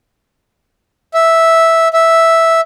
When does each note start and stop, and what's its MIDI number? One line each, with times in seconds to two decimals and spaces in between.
1.14 1.88 76
1.93 2.61 76